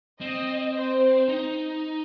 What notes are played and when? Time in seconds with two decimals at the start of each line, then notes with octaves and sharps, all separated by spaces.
0.21 C4 D#5
0.75 C5
1.29 D#4